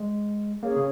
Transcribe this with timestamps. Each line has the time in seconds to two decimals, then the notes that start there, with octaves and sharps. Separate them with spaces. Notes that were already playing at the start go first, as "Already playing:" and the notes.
Already playing: G#3
0.63 A#3 C#4 G#4 C#5
0.76 C#3